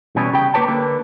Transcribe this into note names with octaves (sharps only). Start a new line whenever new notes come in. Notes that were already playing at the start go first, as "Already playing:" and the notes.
B2 E3 G3 C#4
C#3 G4 G5
A#3 G4 B4 C#5 A5
D3 A#3 B4